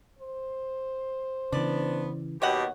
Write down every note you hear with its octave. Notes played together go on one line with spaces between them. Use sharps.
C5
C#3 E3 B3 D4 D5
D#2 B2 G4 C#5 D#5 F#5